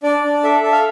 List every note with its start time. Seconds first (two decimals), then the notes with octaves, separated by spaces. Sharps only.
0.03 D4 D5
0.23 D4
0.43 A4 E5
0.63 A4
0.72 F5